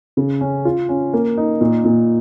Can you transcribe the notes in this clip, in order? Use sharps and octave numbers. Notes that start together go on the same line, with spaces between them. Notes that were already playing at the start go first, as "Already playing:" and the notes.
C#3
C#4
F4
C#4
A#3
D#4
A#2
A#2